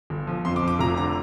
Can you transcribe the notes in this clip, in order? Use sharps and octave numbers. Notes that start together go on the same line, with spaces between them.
G1
F3
F2 C6
D6
F3
D6
F1 A#5
D3 A#5